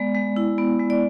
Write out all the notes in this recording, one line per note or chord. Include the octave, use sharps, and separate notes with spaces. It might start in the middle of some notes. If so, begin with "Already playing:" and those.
Already playing: G#3 B3 D5
G#3
E4
B3
G#3
D5